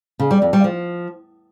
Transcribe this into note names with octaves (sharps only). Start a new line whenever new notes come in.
C#3
G3
F2
G3
F3